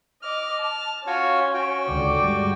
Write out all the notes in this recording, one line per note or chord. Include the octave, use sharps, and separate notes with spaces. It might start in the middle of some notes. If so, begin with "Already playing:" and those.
D#5 D6 F6
A5
C#4 F4 F#4 C#5
F#4 G5
C#2 D3 D5
G2 G3 G#3